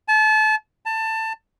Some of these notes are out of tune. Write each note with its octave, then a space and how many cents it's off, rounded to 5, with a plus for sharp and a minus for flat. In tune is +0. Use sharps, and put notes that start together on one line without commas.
A5 -30
A5 +20